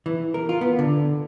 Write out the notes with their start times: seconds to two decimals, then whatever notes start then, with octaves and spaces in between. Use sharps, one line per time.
0.06 E3
0.34 A#4
0.49 F4
0.61 B3
0.79 D3